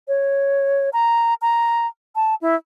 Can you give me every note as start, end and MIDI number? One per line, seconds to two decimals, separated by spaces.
0.08 0.90 73
0.93 1.34 82
1.42 1.87 82
2.15 2.35 81
2.42 2.56 64